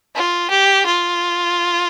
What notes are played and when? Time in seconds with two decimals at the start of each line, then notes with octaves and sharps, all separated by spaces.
0.16 F4
0.51 G4
0.85 F4